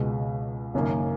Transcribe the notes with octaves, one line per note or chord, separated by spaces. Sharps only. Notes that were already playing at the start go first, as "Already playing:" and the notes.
Already playing: C#2 B2 G#3
F#1 F#2 D#3 A#3